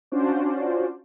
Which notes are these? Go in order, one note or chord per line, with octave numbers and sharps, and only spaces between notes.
C#4 D4 F4 F#4 C5 D5